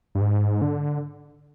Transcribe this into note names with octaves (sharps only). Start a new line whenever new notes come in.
G2
G#2
D3